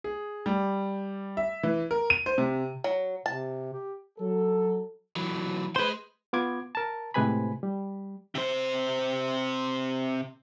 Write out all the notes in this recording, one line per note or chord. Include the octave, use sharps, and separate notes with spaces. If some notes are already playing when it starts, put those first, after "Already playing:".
G#4
G3
E5
E3
A#4
D#7
C5
C3
F#3
C3 A5
G4
F#3 A4
E3 F#3
G#4 B4 C5 C6
B3 F4 D6 G#6
A#4 A5
A2 C3 G#3 B4 G#5 B5
G3
C3 C5